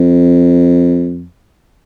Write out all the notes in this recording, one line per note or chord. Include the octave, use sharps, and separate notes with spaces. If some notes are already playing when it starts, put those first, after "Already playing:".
Already playing: F2